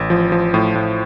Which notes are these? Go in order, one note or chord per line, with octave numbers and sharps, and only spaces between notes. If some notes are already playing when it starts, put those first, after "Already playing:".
Already playing: A1
F3
F3
A2
A2